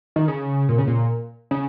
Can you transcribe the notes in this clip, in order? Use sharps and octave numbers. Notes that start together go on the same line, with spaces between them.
D#3
C#3
A#2
C#3
A#2
C#3